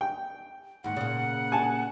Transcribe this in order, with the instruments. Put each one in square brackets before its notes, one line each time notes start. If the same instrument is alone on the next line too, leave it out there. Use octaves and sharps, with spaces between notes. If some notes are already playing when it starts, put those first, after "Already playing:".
[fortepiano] G5
[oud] D#2 G#2 [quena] F#5
[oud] A#2 C#3
[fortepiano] G#5 A5